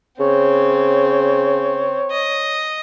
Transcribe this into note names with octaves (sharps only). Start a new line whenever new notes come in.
C#3 C4 C#5
D#5